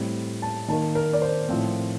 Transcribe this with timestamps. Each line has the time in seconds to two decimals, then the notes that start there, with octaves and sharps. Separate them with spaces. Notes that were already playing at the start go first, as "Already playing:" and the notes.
Already playing: A2 G3 C4
0.42 A5
0.68 D#3 A5
0.73 A#3
0.95 A#4
1.13 D5
1.22 C5
1.49 A2 F3 C4